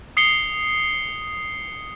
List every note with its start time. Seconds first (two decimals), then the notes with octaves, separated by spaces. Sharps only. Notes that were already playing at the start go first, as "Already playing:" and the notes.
0.17 D#6 C7 C#7 G7